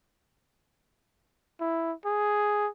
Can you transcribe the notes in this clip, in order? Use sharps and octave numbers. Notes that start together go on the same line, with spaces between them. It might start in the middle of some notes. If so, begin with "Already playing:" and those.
E4
G#4